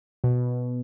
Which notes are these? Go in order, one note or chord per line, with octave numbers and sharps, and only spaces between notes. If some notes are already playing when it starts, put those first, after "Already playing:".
B2